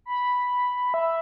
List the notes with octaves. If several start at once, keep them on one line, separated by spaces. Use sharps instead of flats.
B5
E5